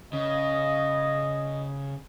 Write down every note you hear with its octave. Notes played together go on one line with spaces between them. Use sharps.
C#3 D#5